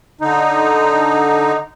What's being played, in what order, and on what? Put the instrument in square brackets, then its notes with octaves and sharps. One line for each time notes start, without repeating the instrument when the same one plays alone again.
[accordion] D3 D#4